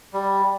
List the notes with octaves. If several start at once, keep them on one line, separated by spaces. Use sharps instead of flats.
G3